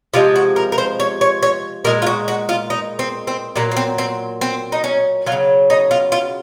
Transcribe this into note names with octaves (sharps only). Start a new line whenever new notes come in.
C3 F3 G#3 F4
F#4
A#4
A#4
C5
C#5
C#5
C#5
A#2 G#3 A#4
F4
F#4
F#4
F4
D#4
C4
C4
A#2 F#3 A#3
A#3
C4
C4
C4
D#4
C#4
F#3 F4
C#3
D#4
F4
F4